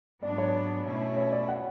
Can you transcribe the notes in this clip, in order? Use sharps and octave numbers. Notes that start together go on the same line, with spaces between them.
G#2 F#3 B3 D4 D5
C#5
B2 A3 C#4 E4
C#5
D5
F#5